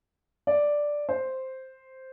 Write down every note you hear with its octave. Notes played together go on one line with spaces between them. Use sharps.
D5
C5